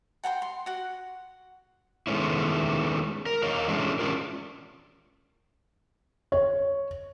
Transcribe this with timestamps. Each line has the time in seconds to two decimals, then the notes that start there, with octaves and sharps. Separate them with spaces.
0.24 F#5 G5 A5 C6
0.42 C6
0.66 F#4 F#5
2.07 D#3 G#3 A3 B3 C#4 E4
3.26 A#4
3.43 A#4 C#5 D#5 F5
3.68 E3 G#3 A3 C#4 D4
3.99 C#4 D4 F4 A#4
6.32 C#5